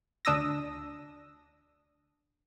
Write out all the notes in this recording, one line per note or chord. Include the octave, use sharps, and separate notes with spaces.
D2 D4 D#6 E6 A#6